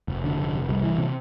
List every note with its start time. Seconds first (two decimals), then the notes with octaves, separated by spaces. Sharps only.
0.08 F1
0.24 D3
0.38 F1
0.53 F1
0.69 C2
0.83 E3
0.98 C3